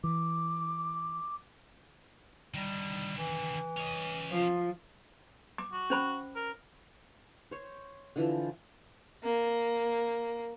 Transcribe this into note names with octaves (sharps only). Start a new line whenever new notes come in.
E3 D6
D3 D#3 G3
E3
C#4 D#5
F3
D6
F#4
C#4 C5 B5
A#4
C5 C#5
D3 E3 F3
A#3